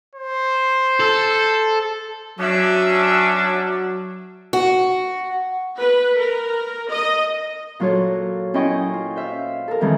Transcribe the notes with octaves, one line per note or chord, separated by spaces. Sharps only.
C5
A4
F#3 C#4 D4 E5
F#4
B4
A#4
D#5
A#2 F#3 F4 F#4 A4 C#5
C#4 E4 F4 D#5 G5 C#6
F4
C5 E5 F5
A4 A#4
F2 D#3 E3 G#3 C4